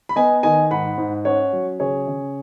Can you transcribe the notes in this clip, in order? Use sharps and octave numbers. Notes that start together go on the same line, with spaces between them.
B5
B3 D#5 G#5
D#3 D#5 G#5
G#2 F#5 B5
G#2
C#4 C#5 F#5
F#3
C#3 G#4 C#5
C#3